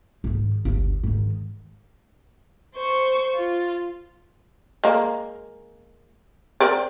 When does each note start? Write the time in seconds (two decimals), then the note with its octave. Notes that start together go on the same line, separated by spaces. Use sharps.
0.24 G#2 D#3
0.65 G1 D2
1.03 G#2 D#3
2.75 C5 C#6
3.35 F4
4.84 G#3 A#3
6.60 C4 A#4 D5